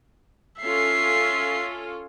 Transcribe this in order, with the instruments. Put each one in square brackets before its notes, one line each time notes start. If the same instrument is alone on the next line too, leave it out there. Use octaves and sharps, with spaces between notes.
[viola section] C#4 F4 A4 [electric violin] E5 C7